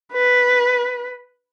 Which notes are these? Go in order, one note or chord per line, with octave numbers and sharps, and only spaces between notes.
B4